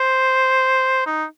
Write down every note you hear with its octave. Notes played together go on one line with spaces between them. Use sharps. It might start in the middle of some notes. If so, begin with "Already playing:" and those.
Already playing: C5
D#4